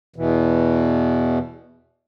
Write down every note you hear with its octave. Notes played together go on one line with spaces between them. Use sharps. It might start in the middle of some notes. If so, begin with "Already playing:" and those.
E2 B2 E3